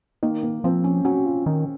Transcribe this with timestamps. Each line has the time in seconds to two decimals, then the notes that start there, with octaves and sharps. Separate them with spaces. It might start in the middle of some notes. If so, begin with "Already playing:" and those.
0.23 D#3 A#3
0.43 A#3
0.64 F3 C4
0.84 C#4
1.05 F#3 C#4
1.26 F3
1.46 D#3